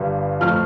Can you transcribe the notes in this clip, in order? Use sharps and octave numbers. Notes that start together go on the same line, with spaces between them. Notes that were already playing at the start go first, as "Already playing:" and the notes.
Already playing: G1 G2 G3
F2 F3 A3 F6